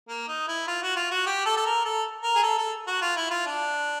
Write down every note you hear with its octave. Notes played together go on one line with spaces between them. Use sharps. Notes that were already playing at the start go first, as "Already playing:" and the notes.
A#3
D#4
E4
F4
F#4
F4
F#4
G4
A4
A4
A#4
A4
A#4
G#4
A4
A4
F#4
F4
E4
F4
D4